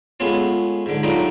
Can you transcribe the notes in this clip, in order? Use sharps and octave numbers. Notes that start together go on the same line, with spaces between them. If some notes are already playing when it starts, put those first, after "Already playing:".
G#3 A3 B3 C#4 F4
G#2 D3
F#3 G3 A3 D4 D#4 F4